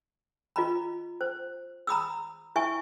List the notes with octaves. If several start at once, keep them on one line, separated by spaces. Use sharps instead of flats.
F4 D#5 A#5 B5
C5
A#5 B5 D#6 E6
E4 E5 G#5 C#6